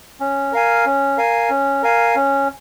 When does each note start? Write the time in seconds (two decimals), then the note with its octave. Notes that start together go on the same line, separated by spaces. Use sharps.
0.20 C#4
0.52 A#4 F5 G#5
0.85 C#4
1.17 A#4 F5 G#5
1.50 C#4
1.83 A#4 F5 G#5
2.15 C#4